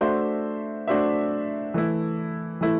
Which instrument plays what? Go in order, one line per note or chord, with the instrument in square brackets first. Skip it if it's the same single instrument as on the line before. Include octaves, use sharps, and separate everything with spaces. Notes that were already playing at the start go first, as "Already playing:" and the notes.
[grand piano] A3 D4 F#4 C5 E5
A3 D4 F#4 C5 E5
E3 A3 E4
E3 A3 E4